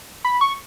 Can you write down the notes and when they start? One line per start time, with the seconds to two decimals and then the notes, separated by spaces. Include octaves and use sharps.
0.25 B5
0.41 C#6